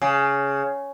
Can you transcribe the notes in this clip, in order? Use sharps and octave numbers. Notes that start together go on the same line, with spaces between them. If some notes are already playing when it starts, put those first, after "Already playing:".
C#3